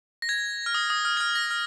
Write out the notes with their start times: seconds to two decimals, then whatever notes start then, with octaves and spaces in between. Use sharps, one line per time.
0.22 A#6
0.29 G#6
0.66 F6
0.75 D#6
0.90 D#6
1.05 F6
1.17 G#6
1.20 F6
1.35 A#6
1.51 F6